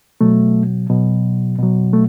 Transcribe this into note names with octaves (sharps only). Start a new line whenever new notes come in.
B2 F#3 A3
B2 F#3
B2 F#3
A3